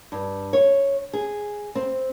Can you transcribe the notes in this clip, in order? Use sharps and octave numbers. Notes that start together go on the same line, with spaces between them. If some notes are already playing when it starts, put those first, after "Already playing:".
G2
C#5
G#4
C4